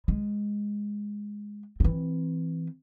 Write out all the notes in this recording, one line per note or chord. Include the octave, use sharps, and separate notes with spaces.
G#3
E3 C4